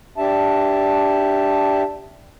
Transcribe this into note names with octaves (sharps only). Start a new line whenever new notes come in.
D4 G4 E5 A5